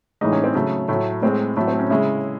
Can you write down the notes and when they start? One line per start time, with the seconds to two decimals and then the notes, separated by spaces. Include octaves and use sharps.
0.21 A2 E3 G#3 D#4
0.32 C#4
0.44 C4
0.55 C#3 F#3 A3
0.88 A2 F#3 A3
1.22 A2 G#3 C4
1.56 A2 F#3 A3
1.68 C4
1.79 C#4
1.90 C#3 G#3 E4